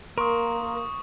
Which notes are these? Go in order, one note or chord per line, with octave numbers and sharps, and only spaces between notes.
A#3 A#4 C6 C#6 D#6